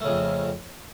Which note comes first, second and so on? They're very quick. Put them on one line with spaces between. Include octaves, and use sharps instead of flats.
A3 C#3 F2